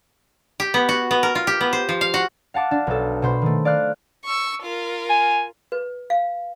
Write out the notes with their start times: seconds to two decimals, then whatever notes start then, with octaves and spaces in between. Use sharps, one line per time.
0.60 G4
0.74 B3
0.89 F#4
1.11 B3
1.23 A#4
1.35 F4
1.47 G4
1.61 B3
1.73 C5
1.89 F3
2.01 F5
2.14 F#4
2.54 F5 F#5 A5 D6
2.71 D4
2.87 B1 A4
3.22 B2 C5 B5
3.42 D#3 A3
3.65 D5 F5 F6 F#6
4.25 C#6 E6
4.63 F4 A#4
5.10 G#5
5.72 B4
6.10 F5